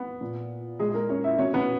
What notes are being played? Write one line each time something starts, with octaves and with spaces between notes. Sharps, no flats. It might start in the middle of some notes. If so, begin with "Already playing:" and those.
Already playing: B3
A#2
A#2 G#3 G#4
G#4
A#3 A#4
C#4 C#5
E4 E5
B2 C#4 C#5
B3 B4